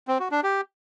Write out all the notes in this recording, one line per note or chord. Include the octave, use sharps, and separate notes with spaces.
C4
F#4
D4
G4